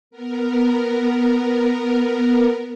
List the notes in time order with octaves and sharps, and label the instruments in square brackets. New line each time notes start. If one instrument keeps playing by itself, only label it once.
[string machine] B3 A#4